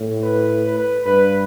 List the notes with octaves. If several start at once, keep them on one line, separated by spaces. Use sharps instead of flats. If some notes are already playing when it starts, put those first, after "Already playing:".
Already playing: A2
B4
B4
G2 B4